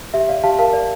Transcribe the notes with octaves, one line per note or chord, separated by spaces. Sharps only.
G4 E5
D5 F5
G4 F5 A5
A#4 F5 A5
D5